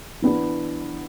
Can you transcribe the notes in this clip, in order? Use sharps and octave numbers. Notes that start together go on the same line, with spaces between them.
E3 B3 D4